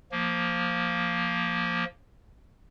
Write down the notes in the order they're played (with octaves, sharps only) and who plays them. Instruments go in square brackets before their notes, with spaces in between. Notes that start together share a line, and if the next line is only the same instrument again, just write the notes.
[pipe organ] F3 A#3